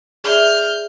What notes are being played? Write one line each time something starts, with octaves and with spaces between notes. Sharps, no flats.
G#4 D5 E5 F6 G6